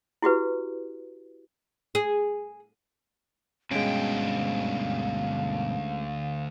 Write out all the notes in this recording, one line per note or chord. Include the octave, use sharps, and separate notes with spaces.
E4 F#4 G4 B4
G#4
D2 G2 B2 G#3 C#4 F5 G5